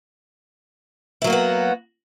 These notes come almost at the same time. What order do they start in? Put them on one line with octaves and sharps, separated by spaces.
E4 F#3 A#3 F#4 B3